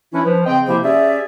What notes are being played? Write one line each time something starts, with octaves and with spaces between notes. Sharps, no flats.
E3 C#4 D4 E4
F3 B4
C#3 C4 D#5 G5
C3 F3 A#3 E4 G4 C5
C#4 G4 G#4 D5 E5